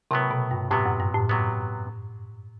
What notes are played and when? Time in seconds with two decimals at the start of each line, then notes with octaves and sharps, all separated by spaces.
0.11 A2 C3 F#3 B3
0.31 B2
0.51 G2
0.71 A2 C3 F#3 B3
0.86 F#2
1.00 G2
1.14 A2
1.29 C3 F#3 B3